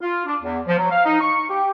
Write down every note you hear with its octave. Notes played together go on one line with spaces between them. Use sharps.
F4
D4
E2
F3
F#3
F5
D#4
C#6
G4